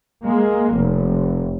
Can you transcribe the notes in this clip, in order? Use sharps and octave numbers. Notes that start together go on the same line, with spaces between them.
G#3 A#3
F1